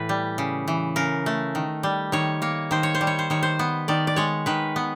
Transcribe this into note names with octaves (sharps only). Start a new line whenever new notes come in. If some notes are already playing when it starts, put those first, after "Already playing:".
Already playing: A2 E3 B4
G3
C#3
E3
C#3 A#4
A3
D#3
G3
D#3 C#5
A#3 C#5
D#3 C5
C#5
C5
G3
C#5
C5
D#3 C#5
C5
B3
D#3 D5
D5
G#3 C#5
D#3 B4
B3